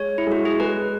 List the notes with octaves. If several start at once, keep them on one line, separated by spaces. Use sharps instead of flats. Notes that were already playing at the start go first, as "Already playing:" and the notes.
Already playing: G#3 C#5
E4
G#3 F#4
G#4
G#3 B4